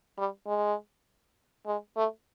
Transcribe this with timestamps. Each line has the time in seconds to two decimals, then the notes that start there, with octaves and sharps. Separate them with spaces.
0.18 G3
0.47 G#3
1.66 G#3
1.97 A3